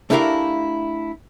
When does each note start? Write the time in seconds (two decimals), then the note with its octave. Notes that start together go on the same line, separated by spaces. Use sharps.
0.10 A3 D4 E4 G4 A#4 F5